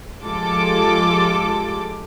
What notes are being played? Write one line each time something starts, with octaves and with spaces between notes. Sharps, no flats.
F3 G#3 F4 G4 A4 D6